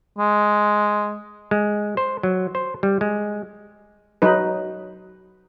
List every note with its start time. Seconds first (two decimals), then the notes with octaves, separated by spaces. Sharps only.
0.18 G#3
1.51 G#3
1.97 C5
2.23 F#3
2.55 C5
2.83 G3
3.01 G#3
4.22 F#3 D#4 B4